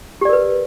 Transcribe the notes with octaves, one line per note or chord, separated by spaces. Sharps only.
G4 A#4 B4 D5